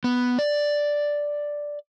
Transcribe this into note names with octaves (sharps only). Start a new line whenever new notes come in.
B3
D5